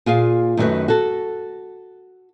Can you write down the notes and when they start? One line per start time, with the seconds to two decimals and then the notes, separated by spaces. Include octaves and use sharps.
0.06 A#2 F4 G#4 F5
0.57 F#2 D#3 A3 D4 F#4 B4
0.88 F#4 A4